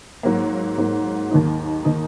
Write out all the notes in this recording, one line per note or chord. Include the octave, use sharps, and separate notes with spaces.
G#2 F#3 A#3
G#2 F#3 A#3
D#2 D#3 A#3 D#4
D#3 A#3 D#4